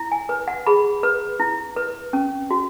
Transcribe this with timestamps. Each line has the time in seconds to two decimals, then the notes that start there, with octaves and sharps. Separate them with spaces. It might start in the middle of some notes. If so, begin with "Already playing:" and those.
Already playing: E4
0.12 G#5
0.29 B4
0.48 F#5
0.67 G#4 B5
1.03 B4
1.40 E4
1.76 B4
2.13 C#4
2.51 F#4